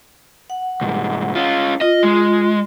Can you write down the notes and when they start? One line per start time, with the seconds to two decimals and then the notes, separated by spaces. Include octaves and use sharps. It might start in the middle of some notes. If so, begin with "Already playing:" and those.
0.50 F#5
0.81 C2 G#2
1.35 C#4 F4
1.81 F4 D#5
2.03 G#3